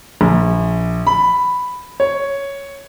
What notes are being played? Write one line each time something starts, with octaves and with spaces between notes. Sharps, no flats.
A#1
B5
C#5